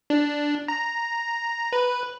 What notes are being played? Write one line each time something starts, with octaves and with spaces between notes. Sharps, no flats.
D4
A#5
B4